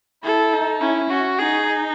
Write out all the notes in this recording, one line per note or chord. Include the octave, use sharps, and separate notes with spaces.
E4 A4
D#4
C#4 E4
C#4 F#4
D#4 G#4